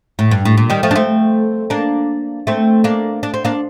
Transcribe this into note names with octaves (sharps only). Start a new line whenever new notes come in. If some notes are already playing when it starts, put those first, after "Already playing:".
A2
G2
A2
A#2
D#3 G3
F3 A3
D4
A3 C4
A#3 D4
A3 C4
A#3 D4
D4
C4
A#3 D4